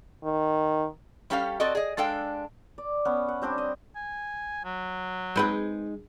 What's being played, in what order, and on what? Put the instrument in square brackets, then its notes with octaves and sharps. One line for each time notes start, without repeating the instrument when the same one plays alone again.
[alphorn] D#3
[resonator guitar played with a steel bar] G3 C#4 G4 A4 C5 F5
C4 F#4 A4 D5 D#5
G#4 D#5
G#3 D4 A4 F5 G5
[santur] D5
B3 C#4
F#5
G3 C4 D4 G4
D#5
[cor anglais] G#5
F#3
[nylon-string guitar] G#3 D#4 G#4 [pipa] C4 B4 G5